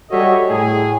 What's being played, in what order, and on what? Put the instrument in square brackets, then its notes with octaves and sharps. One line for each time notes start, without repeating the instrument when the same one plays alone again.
[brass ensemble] G3 F#4 A4 C#5 D#5 E5
A2 G#4